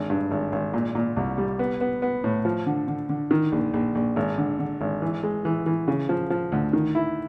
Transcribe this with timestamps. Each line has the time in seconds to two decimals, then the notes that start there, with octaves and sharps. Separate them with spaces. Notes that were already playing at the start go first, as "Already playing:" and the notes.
Already playing: G#1 D3
0.10 G2
0.31 G#1
0.52 G#1
0.74 A#2
0.95 A#2
1.17 C2
1.38 G3
1.59 B3
1.81 B3
2.02 B3
2.24 A2
2.45 F3
2.66 D3
2.88 D3
3.09 D3
3.31 D#3
3.52 A#1
3.74 A#1
3.95 A#1
4.16 G#1
4.38 D3
4.59 D3
4.81 G#1
5.02 E3
5.23 G#3
5.45 E3
5.66 E3
5.88 C#3
6.09 F3
6.30 F3
6.52 D2
6.73 D#3
6.95 E4